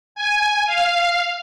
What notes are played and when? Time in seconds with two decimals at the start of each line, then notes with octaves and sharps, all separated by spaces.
0.15 G#5
0.67 F5